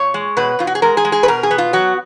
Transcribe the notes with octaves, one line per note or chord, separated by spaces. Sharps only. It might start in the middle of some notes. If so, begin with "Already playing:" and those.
Already playing: A#2 C#5
G#3
B2 B4
B2 F4
F#4
G#4
G#3 A#4
G#4
G#3
G#4
B4
B2 A#4
G#4
B3
F4
F#3 F#4